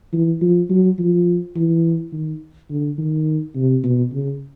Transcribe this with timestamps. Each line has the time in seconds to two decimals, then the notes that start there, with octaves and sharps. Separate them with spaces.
0.13 E3
0.41 F3
0.70 F#3
0.99 F3
1.55 E3
2.12 D#3
2.70 D3
2.98 D#3
3.55 C3
3.84 B2
4.13 C#3